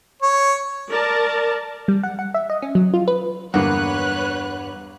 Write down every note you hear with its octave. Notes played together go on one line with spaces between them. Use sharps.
C#5
A#4 D5 A5
G3
F#5
F#5
E5
D#5
C#4
F#3
F4
B4
E2 G2 D3 A#3 B4 C#5 F#5 F#6